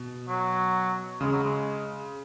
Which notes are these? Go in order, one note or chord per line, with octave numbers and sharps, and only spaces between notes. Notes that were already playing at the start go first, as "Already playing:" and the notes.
Already playing: B2
F#3
C#3 G#3
F#3
G#3